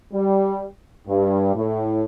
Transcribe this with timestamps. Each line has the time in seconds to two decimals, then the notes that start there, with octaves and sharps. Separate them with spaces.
0.13 G3
1.07 G2
1.54 A2